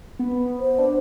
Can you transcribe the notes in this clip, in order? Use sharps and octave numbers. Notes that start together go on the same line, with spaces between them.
B3
C5
D4